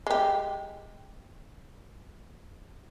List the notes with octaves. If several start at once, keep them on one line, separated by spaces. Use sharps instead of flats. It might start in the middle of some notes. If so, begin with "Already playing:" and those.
G#3 G4